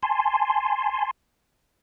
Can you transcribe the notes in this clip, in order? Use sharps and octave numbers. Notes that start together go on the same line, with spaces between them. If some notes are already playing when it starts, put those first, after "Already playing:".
G#5 A5 C6